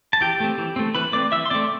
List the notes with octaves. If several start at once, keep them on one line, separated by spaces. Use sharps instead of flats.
A5
E3 G4 G5
A3 C4
E3
A3 C4
E3 B4 B5
A3 C4 D5 D6
E3 E5 E6
C6
A3 C4 D5 D6